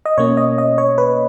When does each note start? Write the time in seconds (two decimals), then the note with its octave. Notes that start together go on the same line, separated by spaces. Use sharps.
0.05 D#5
0.18 B2 A#3 C#4 C#5
0.37 D#5
0.58 D#5
0.78 C#5
0.98 B4